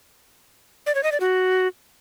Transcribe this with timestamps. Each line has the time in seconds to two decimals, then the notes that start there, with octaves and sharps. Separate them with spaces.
0.86 D5
0.95 C#5
1.03 D#5
1.12 D5
1.20 F#4